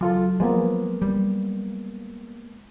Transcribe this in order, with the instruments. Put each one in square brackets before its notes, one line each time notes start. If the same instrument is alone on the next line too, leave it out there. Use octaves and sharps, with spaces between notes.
[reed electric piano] C#2 F4 A4 [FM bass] F#3
[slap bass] F3 [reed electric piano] G#3 A#3 B3
[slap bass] G3